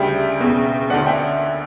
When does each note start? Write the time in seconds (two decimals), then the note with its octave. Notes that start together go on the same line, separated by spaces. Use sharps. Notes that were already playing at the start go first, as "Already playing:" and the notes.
Already playing: D2 C#3 G3 D4 E5 G5
0.39 E1 E2 C#3
0.90 D2 D3 A3 C#4 D5 F#5
1.07 E5 G5